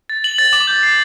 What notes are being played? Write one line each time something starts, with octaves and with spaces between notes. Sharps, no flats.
A6
F#7
A6
D6
G6
C7